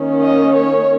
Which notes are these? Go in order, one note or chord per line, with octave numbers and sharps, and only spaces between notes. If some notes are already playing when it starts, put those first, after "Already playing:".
Already playing: D#3 A#3 C#4
D#5
C#5